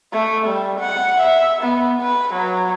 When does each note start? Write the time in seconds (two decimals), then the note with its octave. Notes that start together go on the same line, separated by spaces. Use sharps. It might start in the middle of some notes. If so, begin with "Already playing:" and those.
0.13 A3
0.47 G3
0.80 F#5
1.20 E5
1.61 B3
2.02 B4
2.34 F#3